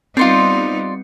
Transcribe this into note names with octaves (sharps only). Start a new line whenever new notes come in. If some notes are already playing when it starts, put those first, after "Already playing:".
G3 B3 C4 D#4 F4 C5 D5 C#7